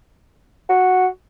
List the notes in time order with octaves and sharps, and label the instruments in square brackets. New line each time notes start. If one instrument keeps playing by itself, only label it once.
[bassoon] F#4